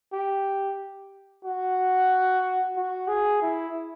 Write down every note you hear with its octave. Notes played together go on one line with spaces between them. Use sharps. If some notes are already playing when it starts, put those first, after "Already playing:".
G4
F#4
F#4
G#4
E4